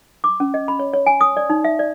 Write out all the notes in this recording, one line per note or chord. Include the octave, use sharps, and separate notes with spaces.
D6
C#4
D#5
B5
C#5
C#5
G#5
D#6
D5
D#4
E5
D5